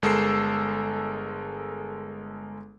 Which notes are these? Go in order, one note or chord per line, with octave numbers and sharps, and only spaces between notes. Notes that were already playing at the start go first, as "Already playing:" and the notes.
G1 G#3 A4 A#4 E6 C7